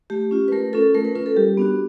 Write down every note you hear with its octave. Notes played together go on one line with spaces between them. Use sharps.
A3 G4
C#4 F4
B4
A3 A#4
C#4 F4 A4
A3 A#4
B4
C#4 F4 A#4
A4
G3 G4
B3 D4 F#4